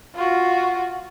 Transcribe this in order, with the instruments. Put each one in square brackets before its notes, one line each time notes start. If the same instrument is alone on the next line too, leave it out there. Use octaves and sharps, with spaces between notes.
[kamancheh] F4 F#4